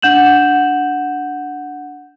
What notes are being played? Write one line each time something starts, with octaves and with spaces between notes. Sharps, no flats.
D4 F#5 G6 E7 F#7